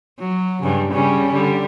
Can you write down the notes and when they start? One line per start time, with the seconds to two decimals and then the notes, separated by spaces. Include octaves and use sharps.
0.19 F#3
0.62 G2 C#3
0.92 C#3 G3 C#4
1.31 D3 G3